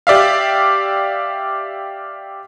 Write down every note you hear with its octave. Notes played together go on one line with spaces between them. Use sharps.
G4 D5 E5 F5